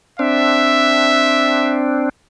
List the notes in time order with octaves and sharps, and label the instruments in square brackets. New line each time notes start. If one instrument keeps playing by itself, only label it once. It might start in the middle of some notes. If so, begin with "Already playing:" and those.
[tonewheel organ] C4 D4 [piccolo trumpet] E5